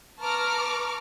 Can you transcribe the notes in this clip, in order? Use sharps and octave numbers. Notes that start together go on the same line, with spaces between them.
B4 A5 A#5 C#6 D6 F6